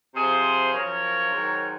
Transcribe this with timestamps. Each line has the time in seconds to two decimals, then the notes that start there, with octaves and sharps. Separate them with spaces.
0.15 C3 F3 G#4 C5
0.73 F#2 F3 A#4 C#5
1.32 G#2 D#3 F#3